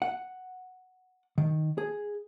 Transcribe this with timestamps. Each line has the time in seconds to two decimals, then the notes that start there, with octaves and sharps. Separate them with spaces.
0.02 F#5
1.38 D#3
1.78 G#4